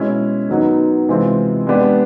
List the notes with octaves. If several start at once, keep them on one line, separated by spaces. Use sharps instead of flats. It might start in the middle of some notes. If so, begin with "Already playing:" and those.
Already playing: B2 G#3 C#4 E4
D#3 F#3 B3 D#4
C3 E3 G#3 C4 F4
G#3 B3 D4 G4